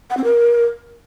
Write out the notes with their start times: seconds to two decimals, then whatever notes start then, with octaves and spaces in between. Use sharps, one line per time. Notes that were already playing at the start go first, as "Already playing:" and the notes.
0.10 F#5
0.17 C4
0.24 A#4